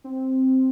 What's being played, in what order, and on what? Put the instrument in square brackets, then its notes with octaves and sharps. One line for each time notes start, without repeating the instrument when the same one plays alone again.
[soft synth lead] C4